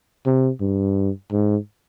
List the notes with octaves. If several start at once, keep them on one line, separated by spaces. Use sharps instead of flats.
C3
G2
G#2